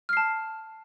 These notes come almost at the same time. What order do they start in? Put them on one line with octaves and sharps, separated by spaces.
F6 C7 A5